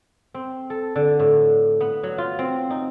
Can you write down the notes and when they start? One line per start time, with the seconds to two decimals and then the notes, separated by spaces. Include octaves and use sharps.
0.34 C4
0.70 A4
0.96 D3
1.20 A2
1.80 B3
2.03 F#3
2.18 F4
2.39 C4
2.70 D#4